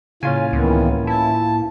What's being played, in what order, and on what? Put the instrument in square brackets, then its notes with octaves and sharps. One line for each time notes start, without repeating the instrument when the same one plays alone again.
[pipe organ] A2 A#3 [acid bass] C#3 [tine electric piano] C#4 F4 G#5
[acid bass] C#2 [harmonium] D#3 E3 B3
[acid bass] E4 [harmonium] A5